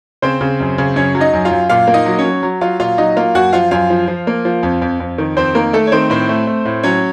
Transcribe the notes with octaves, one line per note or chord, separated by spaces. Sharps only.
C#3 C4 C5
C#3
F#2
C#3
F#2 C#4 C#5
F#3
D#4 D#5
F#2
F4 F5
F#2
A#2 F4 F5
A#3
D#4 D#5
F#3
C#4 C#5
F#3
F#3
F#3 F4 F5
A#2 F4 F5
F#3 D#4 D#5
A#3 F4 F5
F#2 F#4 F#5
F3 F4 F5
F#2 F4 F5
F3
F3
A#3
F3
F2
F2
F2
D#3
F2 C4 C5
D#3 A#3 A#4
A3 A4
C#5
D#3 C4 C5
A2 C4 C5
A3
A3
A2
F#3 C#4 C#5